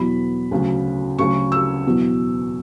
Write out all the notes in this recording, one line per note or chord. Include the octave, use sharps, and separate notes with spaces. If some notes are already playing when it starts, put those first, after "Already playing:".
Already playing: E2 B2 F#3 B5
D2 C#3 F#3
D2 C#3 F#3 C#6
E6
E2 B2 F#3